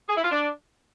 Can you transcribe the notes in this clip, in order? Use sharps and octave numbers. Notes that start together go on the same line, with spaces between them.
G#4
E4
F4
D4